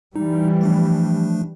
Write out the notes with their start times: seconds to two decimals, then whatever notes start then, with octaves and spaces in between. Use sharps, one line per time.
0.16 E3 G3 D#4
0.61 F3 A3 D4